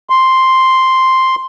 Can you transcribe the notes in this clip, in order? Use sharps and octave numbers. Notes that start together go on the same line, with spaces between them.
C6